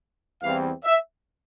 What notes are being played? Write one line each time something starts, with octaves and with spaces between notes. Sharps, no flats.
E2 E3 G3 C4 F5
E5